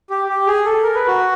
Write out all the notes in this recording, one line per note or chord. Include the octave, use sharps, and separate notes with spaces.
G4
G4
G#4
A4
A#4
B4
F#4